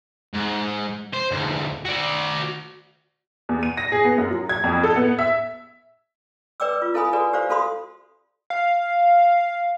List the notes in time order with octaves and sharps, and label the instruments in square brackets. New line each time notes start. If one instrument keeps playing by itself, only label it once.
[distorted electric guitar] G#2
C5
D2 G#2
F#4 D5
[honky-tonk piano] E2
D#7
A#6
G#4
B3
F#2
F#3
G#6
F2
A4
B3
E5
[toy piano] B4 D5 G5 D6 E6
F4
E4 A4 F5 G#5 B5 D#6
F#4 G#4 A4 B4 D5 G#5
G4 C5 D5 F5
F#4 A4 F5 B5 C6 D#6
[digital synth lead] F5